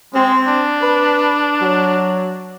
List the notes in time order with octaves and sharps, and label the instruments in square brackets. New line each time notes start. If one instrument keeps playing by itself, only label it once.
[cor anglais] G#3 [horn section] C4
[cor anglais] D4
[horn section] B4
F#3